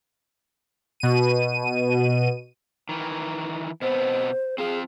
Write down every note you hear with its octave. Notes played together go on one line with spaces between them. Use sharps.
B2 D#7
D#3 E3
B2 B3 C4 C5
C4 F4 G#4 F5